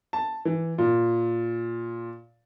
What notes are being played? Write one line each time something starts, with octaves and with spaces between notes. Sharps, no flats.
A5
E3
A#2